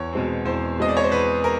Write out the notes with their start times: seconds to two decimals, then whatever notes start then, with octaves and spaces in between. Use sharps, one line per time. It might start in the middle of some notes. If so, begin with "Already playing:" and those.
Already playing: E2 C#5
0.13 B2 G#3 C4
0.45 E2 C5
0.78 B2 G#3 C4 D#5
0.88 D5
0.97 C#5
1.04 C5
1.12 E2 B4
1.44 A#4